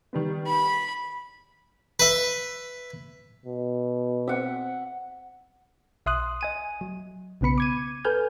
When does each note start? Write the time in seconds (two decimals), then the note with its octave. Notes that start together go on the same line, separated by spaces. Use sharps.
0.13 D#3 G3 B3
0.47 B5
1.99 B4 E5
3.46 B2
4.28 C4 E5 F#5
6.06 B1 E5 C6 D#6 F#6
6.41 D#5 G#5 D#7
6.81 F#3
7.41 B1 C#3 B3 B5 C#7
7.58 D6 G#6 D#7
8.05 A4 B4 G#5 F6 G6